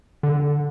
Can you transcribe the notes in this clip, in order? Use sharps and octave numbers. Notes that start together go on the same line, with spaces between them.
D3